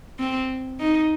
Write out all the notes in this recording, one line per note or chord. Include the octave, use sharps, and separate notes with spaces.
C4
D#4